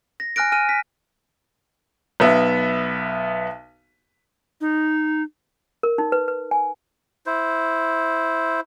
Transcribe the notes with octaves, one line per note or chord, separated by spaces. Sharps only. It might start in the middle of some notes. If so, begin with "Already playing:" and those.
A#6
G#5 F6 F#6 A#6 D7
G#5 F6 D#7
B6
B1 B3 E5
D#4
A#4
D#4
B4
B4
G#5
E4 C5